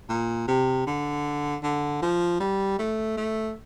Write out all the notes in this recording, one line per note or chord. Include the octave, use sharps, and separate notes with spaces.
A#2
C3
D3
D3
F3
G3
A3
A3